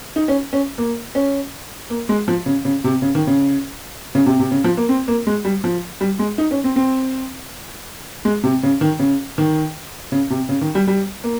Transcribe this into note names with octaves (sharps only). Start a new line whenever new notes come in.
D#4
C#4
C#4
A#3
C#4
A#3
G#3
F3
C#3
C#3
C3
C#3
D#3
C#3
C#3
C3
C3
C#3
F3
A#3
C4
A#3
G#3
G3
F3
G3
G#3
D#4
C#4
C4
C4
G#3
C3
C#3
D#3
C#3
D#3
C#3
C3
C#3
D#3
G3
G3
A#3